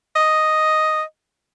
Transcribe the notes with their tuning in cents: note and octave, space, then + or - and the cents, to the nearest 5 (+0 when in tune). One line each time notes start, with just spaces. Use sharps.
D#5 +0